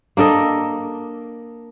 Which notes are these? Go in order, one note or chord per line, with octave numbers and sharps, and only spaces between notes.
A#3 D4 A4 D#5